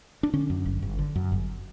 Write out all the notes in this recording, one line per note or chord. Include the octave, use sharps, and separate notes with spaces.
D4
D3 C#4
F#2
G1
G1
D3
F#2
G1